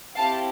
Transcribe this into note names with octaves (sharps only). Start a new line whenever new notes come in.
C4 E4 G4 F5 A5